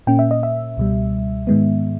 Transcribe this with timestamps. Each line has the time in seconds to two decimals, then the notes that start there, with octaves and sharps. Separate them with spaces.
0.07 A#2 A#3 C#4 G5
0.19 E5
0.31 D#5
0.43 E5
0.77 C#2 B2 G3
1.47 G#2 D#3 G#3 B3